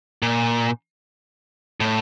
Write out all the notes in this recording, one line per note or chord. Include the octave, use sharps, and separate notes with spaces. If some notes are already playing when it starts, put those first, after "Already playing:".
A#2
A2